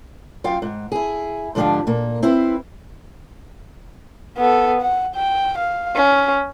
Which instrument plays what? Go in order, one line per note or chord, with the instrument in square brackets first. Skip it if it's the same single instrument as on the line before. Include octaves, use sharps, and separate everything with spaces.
[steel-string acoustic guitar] F#2 F4 F5 G5
G#2
E4 G#4
G#2 D3 F3 D4 G4 F5
A#2 A#3
C4 E4 B4 C5
[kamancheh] B3 A4
F#5
G5
F5
C#4